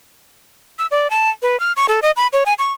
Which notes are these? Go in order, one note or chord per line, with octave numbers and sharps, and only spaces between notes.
E6
D5
A5
B4
F6
C#6
A4
D#5
B5
C#5
G#5
C#6